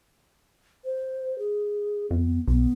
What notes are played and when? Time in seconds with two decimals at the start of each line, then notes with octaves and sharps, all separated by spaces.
0.84 C5
1.39 G#4
2.10 F2 B3
2.47 B1 B3